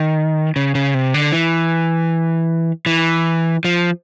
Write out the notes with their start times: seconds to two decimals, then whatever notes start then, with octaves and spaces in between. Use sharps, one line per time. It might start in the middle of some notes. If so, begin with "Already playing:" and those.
Already playing: D#3
0.56 C#3
0.75 C#3
0.94 C3
1.14 D3
1.32 E3
2.86 E3
3.64 F3